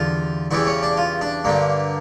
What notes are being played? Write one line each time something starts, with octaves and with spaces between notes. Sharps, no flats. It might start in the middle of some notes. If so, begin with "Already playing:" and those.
Already playing: E2 D3 G3 F4
E2 C#3 E3 G3 E4
C#4
D4
F4
D4
G2 D3 G3 A#3